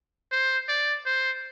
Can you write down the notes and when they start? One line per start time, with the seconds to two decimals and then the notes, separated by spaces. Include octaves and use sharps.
0.32 C5
0.69 D5
1.06 C5